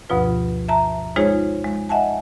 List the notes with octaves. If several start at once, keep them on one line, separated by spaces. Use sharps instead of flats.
D2 G2 B2 F3 F4 B4
E5 A5 A#5
G#3 D#4 F4 G#4 C5 C#5
G#3
D#5 E5 F#5 G#5 A5